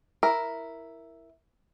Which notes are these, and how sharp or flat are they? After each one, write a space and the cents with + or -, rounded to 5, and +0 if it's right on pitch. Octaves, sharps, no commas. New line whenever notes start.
E4 +0 A#4 +0